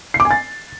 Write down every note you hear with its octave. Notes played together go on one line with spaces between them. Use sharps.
C7
D6
G#5
A6